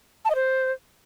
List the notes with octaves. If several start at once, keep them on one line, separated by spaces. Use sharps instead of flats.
A5
D#5
C5